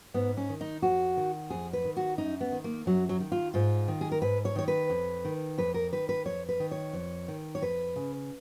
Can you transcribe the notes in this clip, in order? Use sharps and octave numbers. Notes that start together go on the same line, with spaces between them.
G#2 B3
C#4
D#3
D#4
F2 F#4
D#3
F2 G#4
B4
D#3
F#4
F#2 D#4
B3
D#3
A#3
F#2 F#3
F#3
D#3
F4
G#2 F4
D#3
G#4
A#4
G#2 B4
C#5
D#3 C#5
B4
F2
D#3
F2 B4
A#4
D#3 B4
B4
F2 C#5
B4
D#3
C#5
F2
D#3
C#5
F2 B4
C#3